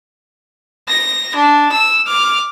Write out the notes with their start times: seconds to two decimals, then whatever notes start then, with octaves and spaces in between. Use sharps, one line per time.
0.89 A#6
1.35 D4
1.72 E6
2.07 D6 F6